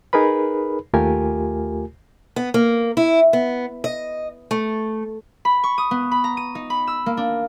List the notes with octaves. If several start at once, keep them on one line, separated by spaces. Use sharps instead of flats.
D#4 G#4 A#4 B4 B5
D#2 A3 F4 G4 A#4 G#5
B3
A#3
E4
B3
D#5
A3
B5
C#6
D#6
B3
B5
A#5
D#7
D#4
B5
E6
A#3
D4